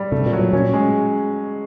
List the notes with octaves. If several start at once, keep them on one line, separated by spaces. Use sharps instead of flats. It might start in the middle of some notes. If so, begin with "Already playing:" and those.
Already playing: G3
C3 A3
A#2
F#3
A#2
A#2 C#4
G#3